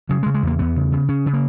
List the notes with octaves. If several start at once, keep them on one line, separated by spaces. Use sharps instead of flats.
C#3 F#3
G#3
C#3
G#3
E2 A#3
E2 B3
C#3
C#3
C#3 C#4
C#3
A#3